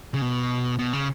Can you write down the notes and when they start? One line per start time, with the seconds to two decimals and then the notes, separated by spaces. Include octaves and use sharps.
0.14 C#3
0.22 B2
0.79 B2
0.93 C#3